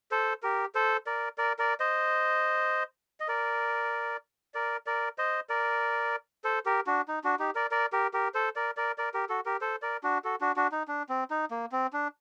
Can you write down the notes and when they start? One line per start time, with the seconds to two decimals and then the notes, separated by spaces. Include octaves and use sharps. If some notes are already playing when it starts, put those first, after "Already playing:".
0.11 A4 C5
0.43 G4 A#4
0.75 A4 C5
1.07 A#4 D5
1.38 A#4 D5
1.59 A#4 D5
1.80 C5 D#5
3.20 D#5
3.28 A#4 D5
4.54 A#4 D5
4.86 A#4 D5
5.18 C5 D#5
5.49 A#4 D5
6.44 A4 C5
6.66 G4 A#4
6.87 D4 F#4
7.08 D#4
7.24 D4 F#4
7.39 D#4 G4
7.55 A#4 D5
7.71 A#4 D5
7.93 G4 A#4
8.13 G4 A#4
8.34 A4 C5
8.56 A#4 D5
8.77 A#4 D5
8.98 A#4 D5
9.14 G4 A#4
9.29 F#4 A4
9.46 G4 A#4
9.61 A4 C5
9.82 A#4 D5
10.03 D4 F#4
10.24 F#4 A4
10.41 D4 F#4
10.56 D4 F#4
10.72 D#4
10.88 D4
11.09 C4
11.30 D#4
11.51 A#3
11.72 C4
11.93 D4